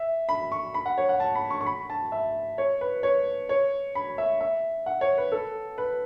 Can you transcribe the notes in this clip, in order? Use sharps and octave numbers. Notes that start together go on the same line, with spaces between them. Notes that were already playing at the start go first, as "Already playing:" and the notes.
Already playing: E5
B5
C#6
B5
F#5
C#5
F#5
A5
B5
C#6
C#6
B5
A5
E5
C#5
B4
C#5
C#5
B5
E5
E5
F#5
C#5
B4
A4
B4